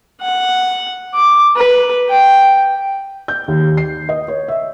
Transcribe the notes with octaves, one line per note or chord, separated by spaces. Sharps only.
F#5
D6
B4
G5
G6
D#2
C7
D#5
C#5
E5